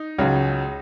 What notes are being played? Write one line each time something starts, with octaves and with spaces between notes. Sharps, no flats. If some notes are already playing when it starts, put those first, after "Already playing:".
Already playing: D#4
C#2 C#3 F#3